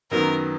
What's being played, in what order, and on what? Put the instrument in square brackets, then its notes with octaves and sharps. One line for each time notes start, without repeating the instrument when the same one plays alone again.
[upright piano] F#2 D#3 F#3 B3 [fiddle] A#4